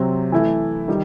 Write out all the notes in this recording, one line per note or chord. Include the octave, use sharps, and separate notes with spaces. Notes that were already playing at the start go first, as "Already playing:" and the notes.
Already playing: C3 F#3 C4
E3 A3 E4
D#3 G3